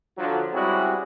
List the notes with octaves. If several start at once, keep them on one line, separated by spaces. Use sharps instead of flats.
D3 F3 F#3
G3 G#3 C4 C#4 E4 F#4